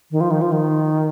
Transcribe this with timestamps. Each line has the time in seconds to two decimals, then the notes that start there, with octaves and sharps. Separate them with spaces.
0.11 D#3
0.21 F3
0.31 D#3
0.41 F3
0.52 D#3